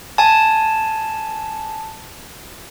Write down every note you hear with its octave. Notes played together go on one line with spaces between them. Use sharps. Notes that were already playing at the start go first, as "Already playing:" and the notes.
G#5 A5